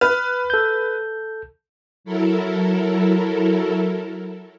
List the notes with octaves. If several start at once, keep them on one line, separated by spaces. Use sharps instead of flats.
B4 F6
A4 G6
F#3 E4 A4 A#4